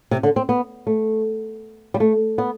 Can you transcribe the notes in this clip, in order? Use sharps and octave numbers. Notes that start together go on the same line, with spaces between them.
C3
D3
C4
B3
A3
G3
A3
B3